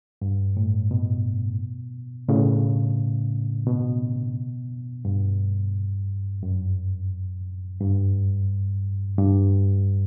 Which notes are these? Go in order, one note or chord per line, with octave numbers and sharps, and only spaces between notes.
G2
A2
B2
A2 C#3
B2
G2
F#2
G2
G2